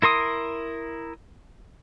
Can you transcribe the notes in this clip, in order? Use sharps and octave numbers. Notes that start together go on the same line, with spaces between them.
E4 A#4 C6 D#6